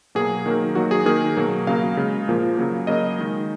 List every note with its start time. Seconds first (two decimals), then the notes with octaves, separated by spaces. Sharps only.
0.15 B2 F#3 A#3 G#4
0.46 D#3 F#3 A#3
0.75 D#3 F#3 A#3 F#4
0.91 G#4
1.06 D#3 A#3 G#4
1.36 B2 F#3 A#3
1.67 C#3 F#3 A#3 F5
1.97 C#3 G#3
2.28 A#2 F3 A#3
2.57 C#3 F#3 A#3
2.87 C#3 F#3 A#3 D#5
3.19 D#3 G#3